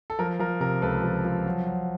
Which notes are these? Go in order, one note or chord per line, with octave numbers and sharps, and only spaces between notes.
A4
F3 A#4
F3 A#4
C3 A#4
C#2 A4 B4
F3
F3
F#3
F#3